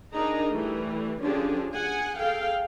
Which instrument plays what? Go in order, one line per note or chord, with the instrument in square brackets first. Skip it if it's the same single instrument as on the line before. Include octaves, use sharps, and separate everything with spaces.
[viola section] D4 D#4 G#4 A#4 D#5 A#5
E3 G3 A3
D3 F3 C#4 D4 G4 G#4
G#4 F#5 G#5
G#4 A4 F5 G5